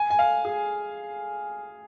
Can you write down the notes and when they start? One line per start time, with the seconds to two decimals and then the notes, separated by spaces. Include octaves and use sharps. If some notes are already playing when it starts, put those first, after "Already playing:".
Already playing: G#5
0.10 G#5
0.19 F5
0.45 G#4